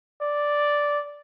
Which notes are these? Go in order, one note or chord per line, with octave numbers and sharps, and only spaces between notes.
D5